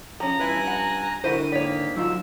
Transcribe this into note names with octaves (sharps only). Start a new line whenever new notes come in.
F3 C#4 A#5
G2 E4 B4 G#5 F#6
F#5
D3 E4 F#4 A#4 C5 D#7
G#2 D#3 A#3 C#5 D5 B6
G#2 D3 F#3 D#4 F4 E6